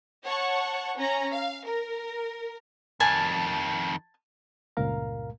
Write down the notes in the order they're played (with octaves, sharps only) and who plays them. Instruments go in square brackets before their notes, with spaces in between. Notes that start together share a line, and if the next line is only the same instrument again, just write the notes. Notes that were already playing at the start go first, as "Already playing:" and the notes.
[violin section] C#5 F#5 A5 C#6
C#4 A#5
F5
A#4
[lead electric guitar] F2 D#3 [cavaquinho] G#5 A5
[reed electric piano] C#2 G2 A#2 A#4 F5 A#5